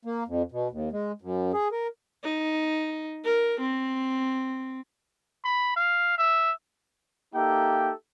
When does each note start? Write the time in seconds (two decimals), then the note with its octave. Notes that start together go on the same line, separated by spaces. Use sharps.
0.05 A#3
0.28 F2
0.52 B2
0.71 D#2
0.92 G#3
1.22 F#2
1.54 G#4
1.72 A#4
2.23 D#4
3.25 A#4
3.60 C4
5.45 B5
5.76 F5
6.18 E5
7.35 A#3 D#4 G4 A4 E5 G5